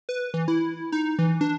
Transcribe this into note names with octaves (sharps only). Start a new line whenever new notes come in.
B4
E3
E4
D#4
E3
D4